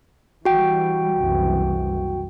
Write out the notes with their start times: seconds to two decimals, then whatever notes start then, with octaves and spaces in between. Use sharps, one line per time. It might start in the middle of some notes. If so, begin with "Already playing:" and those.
0.45 E3 G3 F#4 G5
1.16 F#1 C2 E3